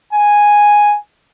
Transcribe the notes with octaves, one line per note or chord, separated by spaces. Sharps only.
G#5